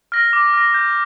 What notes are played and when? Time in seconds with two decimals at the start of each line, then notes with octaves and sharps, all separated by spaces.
0.12 F6 A#6
0.33 D6
0.53 F6 A#6
0.74 G6